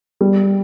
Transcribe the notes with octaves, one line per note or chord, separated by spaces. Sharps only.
G3